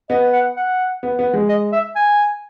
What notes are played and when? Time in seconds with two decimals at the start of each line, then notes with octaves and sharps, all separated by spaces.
0.10 B3 D#5
0.33 F#5
0.56 F#5
1.03 B3
1.19 B3
1.34 G#3
1.49 D#5
1.72 E5
1.96 G#5